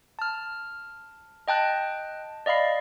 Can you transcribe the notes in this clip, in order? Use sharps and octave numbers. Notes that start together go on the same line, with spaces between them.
A5 F6
D#5 G5 A5 F#6
D5 D#5 F5 B5 C7